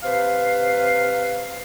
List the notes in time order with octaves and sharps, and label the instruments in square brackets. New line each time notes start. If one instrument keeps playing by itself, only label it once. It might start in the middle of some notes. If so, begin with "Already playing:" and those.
[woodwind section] C3 B4 F5